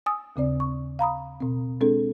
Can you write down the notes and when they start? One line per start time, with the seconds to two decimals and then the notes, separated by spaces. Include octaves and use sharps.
0.06 G#5 D#6 E6
0.36 D#2 C#3 C4 D5
0.60 C#6
0.99 F5 A#5 B5 D#6
1.40 B2 C4
1.81 G#3 C4 D4 G#4 A4